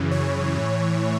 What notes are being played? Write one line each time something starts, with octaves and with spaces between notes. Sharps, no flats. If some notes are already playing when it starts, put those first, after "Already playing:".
Already playing: F#2 C#3 E3
C#5
A2 E3